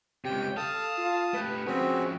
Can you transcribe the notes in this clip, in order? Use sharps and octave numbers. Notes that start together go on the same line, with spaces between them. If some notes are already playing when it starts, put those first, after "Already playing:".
C#2 C3 G4 G5
A4 F5 A5 D#6
F4
A3 G4 B4
F3 C4 C#4 F#4 G#4